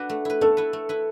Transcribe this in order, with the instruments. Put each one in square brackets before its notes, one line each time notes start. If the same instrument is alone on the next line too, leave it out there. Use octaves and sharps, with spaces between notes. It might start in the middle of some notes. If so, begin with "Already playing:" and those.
Already playing: [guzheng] D4 F#4 B4
A3
E4 B4
[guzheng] A3 [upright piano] A4
[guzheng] E4 B4
A3
E4 B4